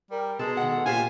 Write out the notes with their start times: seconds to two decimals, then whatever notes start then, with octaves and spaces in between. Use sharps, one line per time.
0.11 G3 A#4
0.39 B2 G#3 A4
0.57 D#3 F#5
0.70 A4
0.86 A#2 F4 G4 C5 G#5